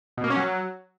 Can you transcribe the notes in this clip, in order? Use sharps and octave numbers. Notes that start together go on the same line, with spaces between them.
B2
A#3
C#4
F#3